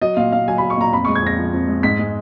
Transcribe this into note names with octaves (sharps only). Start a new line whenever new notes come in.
F#3 D#5
A#2 F5
A#2 F5
F#3 G#5
F#3 B5
C#6
A#2 A#5
F2 B5
G#3 C#6
G#6
F2 A#6
F3
F2
G#3
G#2 B6
G#3